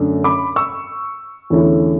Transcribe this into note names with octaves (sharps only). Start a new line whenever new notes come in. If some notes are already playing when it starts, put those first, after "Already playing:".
Already playing: F#2 D3 A3 D4
B5 D6
C#6 E6
E2 D3 A3 C#4 E4